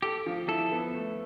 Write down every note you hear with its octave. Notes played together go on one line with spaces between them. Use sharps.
G4 A4
F3
E4 A4
B3
A3